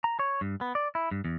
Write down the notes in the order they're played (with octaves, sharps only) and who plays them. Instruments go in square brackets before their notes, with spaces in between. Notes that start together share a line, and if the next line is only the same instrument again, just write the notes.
[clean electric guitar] A#5
C#5
G2
B3
D5
E4
G2
E2